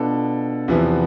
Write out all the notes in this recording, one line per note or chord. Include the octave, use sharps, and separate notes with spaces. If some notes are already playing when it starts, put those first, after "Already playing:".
Already playing: B2 B3 D4 F4 A4
E2 C3 F3 B3 E4